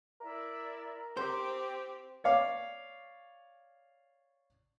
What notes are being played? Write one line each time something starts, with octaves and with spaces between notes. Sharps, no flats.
E4 A#4 D5 E5
C4 G4 C5 G5 D6
C#5 D5 F5 D6